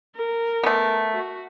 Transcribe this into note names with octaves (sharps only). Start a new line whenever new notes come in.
A#4
A3 B3
F#4